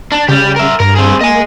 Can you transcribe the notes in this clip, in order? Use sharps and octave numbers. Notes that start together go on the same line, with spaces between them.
D4
C#3 G3 G4
A#4 E5
G2 A#4
C4 G#4
A#3 D#5 G#5